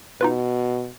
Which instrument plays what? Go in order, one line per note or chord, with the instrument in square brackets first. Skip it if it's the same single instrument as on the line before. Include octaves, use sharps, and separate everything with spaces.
[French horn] B2 [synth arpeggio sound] D#4 F4 B4